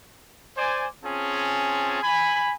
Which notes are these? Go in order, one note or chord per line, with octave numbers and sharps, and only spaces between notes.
C5 D5 G#5
C4 C#4 F4 G#4 G#5 A5
G#5 B5